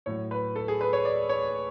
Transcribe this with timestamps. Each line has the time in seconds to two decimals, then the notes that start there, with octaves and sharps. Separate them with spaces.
0.06 A2 F#3 C#5
0.31 B4
0.56 A4
0.68 G#4
0.81 B4
0.93 C#5
1.05 D5
1.29 C#5